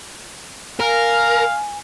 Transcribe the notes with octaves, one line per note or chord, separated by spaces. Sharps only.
A#4 F5 G#5